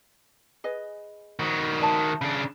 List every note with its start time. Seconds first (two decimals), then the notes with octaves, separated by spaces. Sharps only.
0.64 G#4 B4 D#5
1.39 D#3 F#4
1.81 D5 E5 A5
2.21 C#3 D4